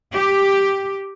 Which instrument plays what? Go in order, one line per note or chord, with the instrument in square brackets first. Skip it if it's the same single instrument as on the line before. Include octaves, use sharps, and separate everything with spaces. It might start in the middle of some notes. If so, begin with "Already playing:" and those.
[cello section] G4